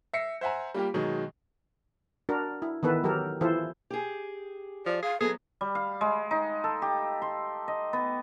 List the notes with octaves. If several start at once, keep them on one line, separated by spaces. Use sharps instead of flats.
E5 A#6 C7 C#7
C5 E5 F#5 G#5 A#5
G3 A#3 F4 G4
B2 D#3 F#3 G#3
D4 F#4 A#4
E4
D#3 E3 B3 A4 B4
F#3 G4 A4 A#4
E3 E4 F4 A4 C5
G4 G#4
F3 D5
G#4 F5
F#3 B3 G#4 A4
G3
F5
G#3
D#4
A4
G4
C6
D#5
B3